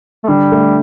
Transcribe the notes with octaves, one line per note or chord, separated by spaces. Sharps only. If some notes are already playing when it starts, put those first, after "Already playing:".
A3
D3 G3
A3